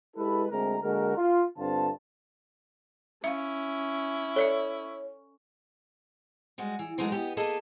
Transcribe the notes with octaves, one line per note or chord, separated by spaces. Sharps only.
G#3 E4 G4 A4 B4
D2 G#3 C4 A#4 A#5
D3 G#3 A#3 F#4 A#4
F4
G2 D3 C4 F4 A5
C#4 E4 E5 F5
A4 C#5 D5 E5
G3 G#3 F#4
E3
E3 F#3 G#3 A3 D#4 F#4
B3 G4 D#5
A#3 G#4 A4 B4 D#5